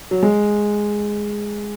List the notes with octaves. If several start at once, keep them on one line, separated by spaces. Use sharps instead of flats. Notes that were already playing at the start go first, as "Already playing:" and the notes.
F#3
G#3